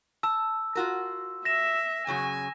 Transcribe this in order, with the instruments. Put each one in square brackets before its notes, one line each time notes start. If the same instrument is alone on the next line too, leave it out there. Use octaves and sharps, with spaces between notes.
[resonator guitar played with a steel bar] A5 [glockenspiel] E6
[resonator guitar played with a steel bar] F4 F#4 A#4
[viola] E5 [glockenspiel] A#6 E7
[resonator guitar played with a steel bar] F#2 C#3 F#3 [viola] G#5